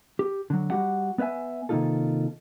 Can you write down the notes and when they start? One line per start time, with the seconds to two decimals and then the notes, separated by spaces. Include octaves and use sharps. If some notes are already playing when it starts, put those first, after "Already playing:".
0.19 G4
0.50 D3 F#3
0.70 G3 F#4 G4 F#5
1.18 B3 B4 C#5 E5 G#5
1.69 C3 D#3 A#3 D#4 F4 A4